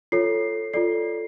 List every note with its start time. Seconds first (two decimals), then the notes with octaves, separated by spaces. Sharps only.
0.12 F4 A4 C#5 C7
0.74 F4 A4 D5 C7